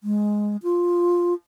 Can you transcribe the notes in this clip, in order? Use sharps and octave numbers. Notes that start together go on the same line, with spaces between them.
G#3
F4